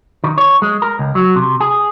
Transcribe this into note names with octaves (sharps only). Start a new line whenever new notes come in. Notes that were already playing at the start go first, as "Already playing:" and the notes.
D#3
C#5
G#3
A#4
C#2
F#3
C3
G#4